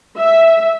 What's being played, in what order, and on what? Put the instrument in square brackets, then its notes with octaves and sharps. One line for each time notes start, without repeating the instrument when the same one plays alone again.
[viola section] E5